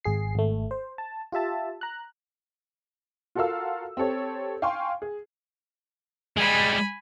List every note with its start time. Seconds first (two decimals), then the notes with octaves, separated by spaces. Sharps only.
0.04 G#1 G#4 C7
0.35 G#1 A3
0.71 C5
0.98 A5
1.32 F4 G4 E5 A5
1.81 A#5 F#6
3.35 F4 F#4 A4 A#4 F5 E6
3.97 C4 G4 A4 C#5
4.62 F5 G5 G#5 C6 C#6
5.02 G#4
6.37 G3 G#3 G#5 B5